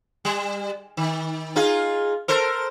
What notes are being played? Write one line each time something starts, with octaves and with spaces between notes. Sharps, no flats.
G3
D#3
D#4 F4 G#4
A4 A#4 C5